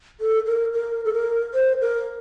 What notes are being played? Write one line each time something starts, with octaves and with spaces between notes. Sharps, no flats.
A4
A#4
A#4
A4
A#4
C5
A#4